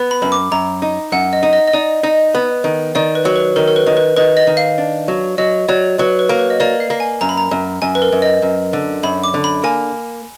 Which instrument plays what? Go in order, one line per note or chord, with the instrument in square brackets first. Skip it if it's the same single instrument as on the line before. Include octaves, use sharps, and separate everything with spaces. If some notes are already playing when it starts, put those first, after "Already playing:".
Already playing: [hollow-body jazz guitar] B3
[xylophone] B5
[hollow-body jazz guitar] F#2 [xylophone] B5
[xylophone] D6
[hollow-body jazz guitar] F#2 [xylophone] A#5
[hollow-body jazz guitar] D#4
[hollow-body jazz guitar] F#2 [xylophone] F#5
[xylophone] D#5
[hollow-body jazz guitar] D#4
[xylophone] D#5
D#5
[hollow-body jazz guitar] D#4 [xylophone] D5
[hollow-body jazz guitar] D#4 [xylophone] D#5
[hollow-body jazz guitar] B3
D#3
[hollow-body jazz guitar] D#3 [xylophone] D5
[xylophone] B4
[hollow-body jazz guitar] F#3
[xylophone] B4
[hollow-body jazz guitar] D#3 [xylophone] A#4
[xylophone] A#4
B4
[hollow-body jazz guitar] D#3
[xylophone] B4
[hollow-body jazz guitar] D#3 [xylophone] B4
[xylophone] D#5
[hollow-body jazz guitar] D#3
[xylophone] F5
[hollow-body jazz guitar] D4
F#3
[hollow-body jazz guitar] F#3 [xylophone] D#5
[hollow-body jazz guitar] F#3 [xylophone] D5
[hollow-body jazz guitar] F#3 [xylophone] B4
[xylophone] B4
[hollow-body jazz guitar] A#3
[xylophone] B4
D#5
[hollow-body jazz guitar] A#3 [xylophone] D5
[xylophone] F5
[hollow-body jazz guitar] A#3
[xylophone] G#5
[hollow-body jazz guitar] F#2 [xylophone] A#5
[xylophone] B5
A#5
[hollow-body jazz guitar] F#2
[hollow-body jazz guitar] F#2 [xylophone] G#5
[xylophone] B4
A#4
[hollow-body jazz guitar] F#2
[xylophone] D#5
[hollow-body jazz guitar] F#2
D3
[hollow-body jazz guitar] F#2 [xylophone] B5
[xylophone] D6
[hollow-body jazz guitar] D3
[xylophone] B5
[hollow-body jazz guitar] A#3 [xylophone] G#5